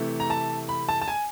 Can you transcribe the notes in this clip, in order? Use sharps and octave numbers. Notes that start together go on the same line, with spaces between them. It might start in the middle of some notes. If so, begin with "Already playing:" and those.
Already playing: C3 E3 A3
A#5
A5
B5
A5
A5
G#5